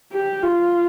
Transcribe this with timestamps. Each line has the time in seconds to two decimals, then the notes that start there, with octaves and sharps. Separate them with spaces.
0.12 G4
0.43 F4